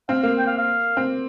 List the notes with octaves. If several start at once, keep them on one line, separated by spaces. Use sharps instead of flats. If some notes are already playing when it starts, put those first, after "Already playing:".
C4 F5
A#3 F5
G5
F5
F5
C4